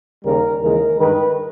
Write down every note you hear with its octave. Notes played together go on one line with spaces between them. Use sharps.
D#2 C#3 G3 A#4
D#2 C#3 E3 G#3 A#4
G2 D#3 G#3 B4